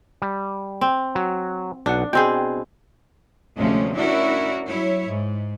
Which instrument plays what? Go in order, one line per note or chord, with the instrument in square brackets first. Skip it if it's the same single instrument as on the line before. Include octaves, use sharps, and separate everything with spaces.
[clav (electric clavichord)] G3
[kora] C4
[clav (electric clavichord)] F#3
[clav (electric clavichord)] B1 F#5 [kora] D4
[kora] B2 C4 G#4 [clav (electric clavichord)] G5
[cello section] D2 C3 F3 G#3 A3 C#4
C#4 D4 E4 F#4 A#4
F#3 E4 C#5
G#2